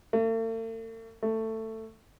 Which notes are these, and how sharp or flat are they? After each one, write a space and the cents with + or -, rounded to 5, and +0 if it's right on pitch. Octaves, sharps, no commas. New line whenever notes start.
A3 +45
A3 +15